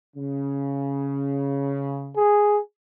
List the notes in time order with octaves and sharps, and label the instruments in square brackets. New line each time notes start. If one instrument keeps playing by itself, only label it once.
[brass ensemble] C#3
[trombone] G#4